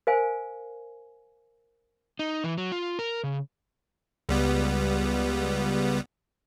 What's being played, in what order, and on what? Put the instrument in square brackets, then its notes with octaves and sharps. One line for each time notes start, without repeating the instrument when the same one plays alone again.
[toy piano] A#4 C5 F5 G#5
[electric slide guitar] D#4
E3
F#3
F4
A#4
C#3
[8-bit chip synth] C#2 G3 B3